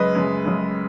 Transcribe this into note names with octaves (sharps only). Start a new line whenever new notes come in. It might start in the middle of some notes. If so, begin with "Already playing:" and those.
Already playing: F#2 C#3 G#3 B4 D#5
F#2 C#3 G#3
F#2 C#3 G#3